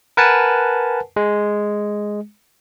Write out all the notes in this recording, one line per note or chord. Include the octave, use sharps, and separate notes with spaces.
A#4 B4 F#5 G#5 A5
G#3